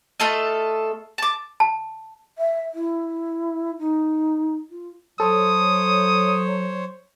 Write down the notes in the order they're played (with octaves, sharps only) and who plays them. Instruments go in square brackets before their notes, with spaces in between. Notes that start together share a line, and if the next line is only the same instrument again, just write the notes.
[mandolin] A3 F4 A4 D#5
A5 D6
[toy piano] A5
[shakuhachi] E5
E4
D#4
F4
[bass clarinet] F#3 [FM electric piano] A4 [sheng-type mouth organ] C5 C#5 [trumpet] D#6